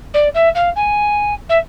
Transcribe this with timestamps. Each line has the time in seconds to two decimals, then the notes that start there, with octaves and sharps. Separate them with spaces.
0.13 D5
0.34 E5
0.55 F5
0.76 G#5
1.49 E5